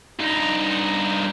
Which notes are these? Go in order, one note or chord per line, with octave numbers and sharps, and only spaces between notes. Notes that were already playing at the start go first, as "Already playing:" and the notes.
G2 D#4